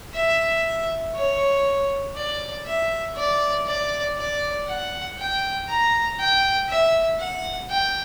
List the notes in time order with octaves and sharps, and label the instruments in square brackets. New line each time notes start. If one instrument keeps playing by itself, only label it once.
[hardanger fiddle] E5
C#5
D5
E5
D5
D5
D5
F#5
G5
A#5
G5
E5
F#5
G5